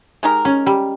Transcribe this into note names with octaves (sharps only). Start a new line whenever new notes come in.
G#3 D#4 G4 A#4
C#4
G3